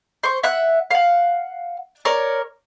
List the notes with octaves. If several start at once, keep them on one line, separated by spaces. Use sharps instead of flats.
C5 C#6
E5 F#5 F#6
F5 F#5
A#4 C#5 D5